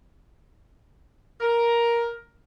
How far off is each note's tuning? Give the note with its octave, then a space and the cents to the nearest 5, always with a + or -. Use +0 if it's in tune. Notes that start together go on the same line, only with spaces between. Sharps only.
A#4 +10